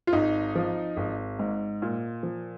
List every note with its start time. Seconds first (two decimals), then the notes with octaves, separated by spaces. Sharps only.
0.07 F4
0.13 G#1 D#4
0.55 F3
0.97 G#1
1.39 G#2
1.82 A#2
2.23 F3